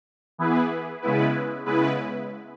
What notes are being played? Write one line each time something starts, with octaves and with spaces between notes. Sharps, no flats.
E3 B3 E4 G#4 B4
C#3 G#3 B3 E4 B4
C#3 G#3 B3 E4 B4